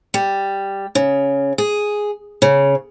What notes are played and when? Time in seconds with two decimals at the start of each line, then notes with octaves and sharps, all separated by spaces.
0.14 G3
0.95 C#3
1.58 G#4
2.42 C#3